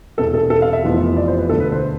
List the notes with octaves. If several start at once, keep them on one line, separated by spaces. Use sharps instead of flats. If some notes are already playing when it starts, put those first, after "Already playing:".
E1 E2 C3 A4
A4
A4
F5
E5
F1 F2 E3 B3 F4
D5
C5
B4
E1 D2 D3 A4
B4
C5